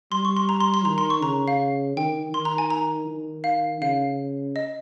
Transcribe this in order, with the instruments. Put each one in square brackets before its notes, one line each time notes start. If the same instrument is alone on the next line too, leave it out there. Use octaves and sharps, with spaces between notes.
[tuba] G3 [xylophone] C6
[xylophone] C#6
C6
A#5
C6
C6
[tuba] D#3 [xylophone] A#5
[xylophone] C6
C#6
[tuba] C#3 [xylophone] A#5
[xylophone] F5
[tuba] D#3 [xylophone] G5
[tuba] D#3 [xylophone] C6
[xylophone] A#5
G#5
A#5
[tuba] D#3
[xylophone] F5
[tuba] C#3 [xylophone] F5
[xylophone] D#5